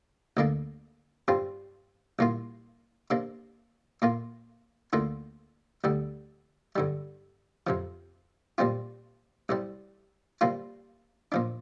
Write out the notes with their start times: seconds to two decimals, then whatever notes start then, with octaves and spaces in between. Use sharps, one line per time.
0.37 D2 D3 A#3 D4
1.28 G2 G3 C4 F4
2.19 C2 A#2 A#3 F4
3.10 C3 A#3 D4
4.02 A#2 A#3 F4
4.93 D2 D3 A#3 F4
5.84 D2 D3 G3
6.76 G2 D3 G3
7.67 F2 C3 F3
8.58 A#2 G3 C4 F4
9.49 C2 C3 G3
10.41 C3 G3 A#3 F4
11.32 A#2 F3 D4